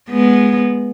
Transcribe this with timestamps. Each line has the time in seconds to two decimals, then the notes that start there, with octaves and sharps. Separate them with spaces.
0.10 G#3 B3